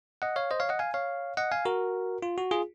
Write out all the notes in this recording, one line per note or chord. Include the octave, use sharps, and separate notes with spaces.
D#5 F#5
C#5 F5
C5 D#5
C#5 F5
D#5 F#5
F5 G#5
C#5 F5
D#5 F#5
F5 G#5
F#4 A#4
F4
F#4
F4 G#4